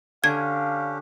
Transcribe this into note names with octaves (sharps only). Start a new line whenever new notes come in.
D3 C#4 D4 G4 F5 G#6